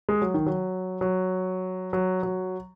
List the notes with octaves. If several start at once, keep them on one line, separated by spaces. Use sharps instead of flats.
G#3
F#3
D#3
F#3
F#3
F#3
F#3